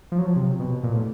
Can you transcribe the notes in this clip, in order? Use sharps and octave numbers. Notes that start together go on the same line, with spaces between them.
F3
F#3
F3
C3
B2
A#2
A2